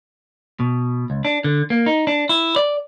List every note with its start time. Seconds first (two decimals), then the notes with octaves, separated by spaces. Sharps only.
0.60 B2
1.10 C#2
1.25 D4
1.44 D3
1.70 A#3
1.86 D#4
2.07 D4
2.29 E4
2.56 D5